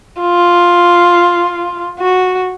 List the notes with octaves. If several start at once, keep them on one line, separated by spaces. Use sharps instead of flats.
F4
F#4